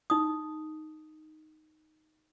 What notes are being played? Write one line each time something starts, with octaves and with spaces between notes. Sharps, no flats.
D#4 D#6